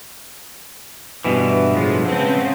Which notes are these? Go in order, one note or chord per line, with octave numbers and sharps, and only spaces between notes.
G2 B2 E3 B4 E5
A2 F3 G#3
C#3 G#3 C4 B4 F#5 A5